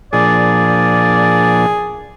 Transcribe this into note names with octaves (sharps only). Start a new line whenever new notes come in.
A#2 F3 D4 G#4 D5